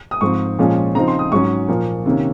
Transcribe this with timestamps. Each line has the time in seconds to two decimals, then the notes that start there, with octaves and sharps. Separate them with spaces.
0.11 D#6
0.21 G#2 F3 C4 C#6
0.59 A#2 F3 G#3 C#4
0.95 C#3 F3 C4 D#4 A#5
1.08 C6
1.19 D#6
1.32 G#2 F#3 C#4 C#6
1.69 A#2 F3 A#3
2.06 C3 D#3 A#3 C#4